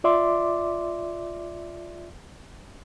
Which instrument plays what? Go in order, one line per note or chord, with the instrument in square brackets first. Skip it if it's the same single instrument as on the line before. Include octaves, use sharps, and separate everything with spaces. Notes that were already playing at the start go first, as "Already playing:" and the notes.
[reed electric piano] F4 D5 E5 C6 D6